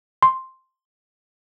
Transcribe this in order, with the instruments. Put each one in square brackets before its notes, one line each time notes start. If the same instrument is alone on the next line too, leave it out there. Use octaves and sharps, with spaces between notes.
[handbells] C6